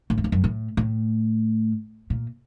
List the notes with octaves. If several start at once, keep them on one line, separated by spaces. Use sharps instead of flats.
A2
F#2
F2
F#2
A2
A2
A#2